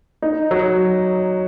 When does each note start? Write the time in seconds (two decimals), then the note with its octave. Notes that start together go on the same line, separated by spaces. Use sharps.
0.22 D#4
0.51 F#3